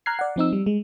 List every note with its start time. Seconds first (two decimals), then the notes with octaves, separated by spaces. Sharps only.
0.06 A#5 F6 F#6 G#6 C7
0.19 D5 F#5
0.36 F3 C4 D#4 E6
0.53 G3
0.66 G#3